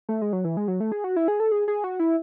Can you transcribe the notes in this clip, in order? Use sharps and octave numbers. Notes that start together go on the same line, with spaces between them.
A3
G#3
F#3
E3
G#3
F#3
A3
G#4
F#4
E4
G#4
A4
G#4
G#4
F#4
E4